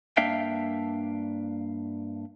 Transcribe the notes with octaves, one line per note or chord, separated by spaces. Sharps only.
G2 A#3 D4 E5 F5 G5